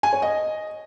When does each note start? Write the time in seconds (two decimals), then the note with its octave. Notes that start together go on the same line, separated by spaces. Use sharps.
0.03 G#5
0.13 C#5
0.22 D#5